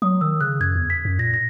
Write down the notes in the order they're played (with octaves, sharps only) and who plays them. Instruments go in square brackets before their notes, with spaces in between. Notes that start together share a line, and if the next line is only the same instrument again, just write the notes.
[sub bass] F#3 [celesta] D#6
[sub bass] D#3 [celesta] E6
[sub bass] C#3 [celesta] F#6
[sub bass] F#2 [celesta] G#6
[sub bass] E2
[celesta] B6
[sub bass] F#2
[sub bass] A#2 [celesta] A#6
[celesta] A#6